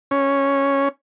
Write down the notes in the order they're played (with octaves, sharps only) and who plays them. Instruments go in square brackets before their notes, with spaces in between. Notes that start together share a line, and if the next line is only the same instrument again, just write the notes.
[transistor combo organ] C#4